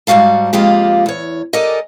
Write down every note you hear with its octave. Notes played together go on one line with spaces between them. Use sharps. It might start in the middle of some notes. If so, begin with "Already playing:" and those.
G#2 G3 F#4 F5 A5
F2 G#3 A#3 F4 G4
E2 C#5
G4 A4 A#4 D5 D#5 G#5